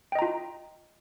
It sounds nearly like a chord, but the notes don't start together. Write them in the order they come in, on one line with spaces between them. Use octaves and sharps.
G5 D#5 A#5 F4